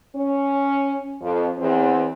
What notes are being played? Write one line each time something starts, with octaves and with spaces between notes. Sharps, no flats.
C#4
F2
E2 C4